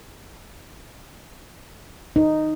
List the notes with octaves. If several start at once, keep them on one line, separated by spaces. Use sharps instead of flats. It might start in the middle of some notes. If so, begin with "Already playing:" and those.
D#4